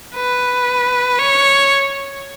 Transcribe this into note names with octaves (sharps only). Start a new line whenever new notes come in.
B4
C#5